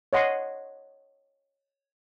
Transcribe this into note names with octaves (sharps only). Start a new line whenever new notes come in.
C#5 D#5 F#5 C6